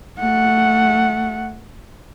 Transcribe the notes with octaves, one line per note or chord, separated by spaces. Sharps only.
A3 F#5